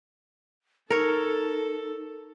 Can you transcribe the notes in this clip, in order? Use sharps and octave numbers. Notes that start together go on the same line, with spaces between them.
D#4 A4 A#4 C#5